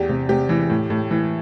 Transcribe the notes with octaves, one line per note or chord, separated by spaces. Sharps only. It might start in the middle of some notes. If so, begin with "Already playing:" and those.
Already playing: E2 G4
C3
C3 G4
E3
A2
A2
E3